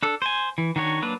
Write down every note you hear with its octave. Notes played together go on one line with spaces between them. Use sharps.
D4 A4
C5 G#5
E3
D#3 D4 F#4 C#5
F#3 A#3 D4 B4